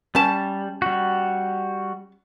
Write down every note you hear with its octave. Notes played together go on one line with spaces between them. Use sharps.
G3 C#4 A5
G3 F#4